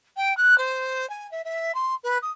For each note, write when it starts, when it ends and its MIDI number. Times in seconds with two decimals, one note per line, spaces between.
0.17 0.35 79
0.37 0.58 90
0.58 1.08 72
1.10 1.30 80
1.31 1.42 76
1.45 1.74 76
1.74 1.95 84
2.04 2.18 71
2.22 2.31 87